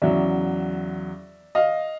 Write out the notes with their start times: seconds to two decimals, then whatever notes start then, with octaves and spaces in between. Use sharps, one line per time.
0.02 E2 C#3 F#3 D5 E5
1.55 D#5 F5